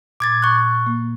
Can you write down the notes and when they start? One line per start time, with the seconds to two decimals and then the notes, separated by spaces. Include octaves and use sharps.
0.20 A#2 D6 G#6 A6
0.43 C#6 F#6
0.87 A#3